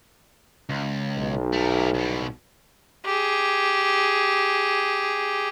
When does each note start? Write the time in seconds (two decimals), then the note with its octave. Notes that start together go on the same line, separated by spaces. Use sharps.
0.69 C#2
1.17 B1
1.53 A3 A#4
1.94 C2 B2
3.05 G4 G#4